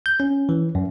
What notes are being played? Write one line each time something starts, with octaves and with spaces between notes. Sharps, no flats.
G6
C#4
E3
F#2